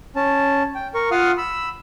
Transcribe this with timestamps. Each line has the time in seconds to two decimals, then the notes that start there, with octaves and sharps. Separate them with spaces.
0.16 C#4 A5
0.75 G5
0.94 A#4 C#6
1.11 F4 F5 F#5 D#6 F6
1.38 B5 E6